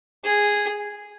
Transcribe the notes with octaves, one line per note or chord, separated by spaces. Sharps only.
G#4